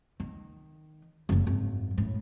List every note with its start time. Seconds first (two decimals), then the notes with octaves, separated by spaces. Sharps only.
0.20 D#3
1.29 F#1 D2
1.47 G#1 F#2
1.98 F#2 A2